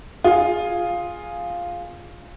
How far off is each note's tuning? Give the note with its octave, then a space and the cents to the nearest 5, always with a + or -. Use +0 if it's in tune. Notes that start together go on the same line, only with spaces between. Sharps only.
F4 +0 G#4 -5